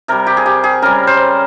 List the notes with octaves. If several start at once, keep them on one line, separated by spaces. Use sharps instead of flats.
C3 G3 A#4
G4
G#4
G4
G#4
C#3 G3 A#4
C5